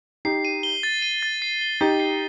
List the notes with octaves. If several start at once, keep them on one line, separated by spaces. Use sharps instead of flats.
D#4 G4 C7
D#7
G7
A6
D#7
A6
C7
G7
D#4 G4 A6
C7